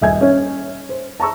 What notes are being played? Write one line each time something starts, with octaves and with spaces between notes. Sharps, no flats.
D#1 D#5 E5 G#5 G#6
C#4 C#5
C5
A5 A#5 C#6 E6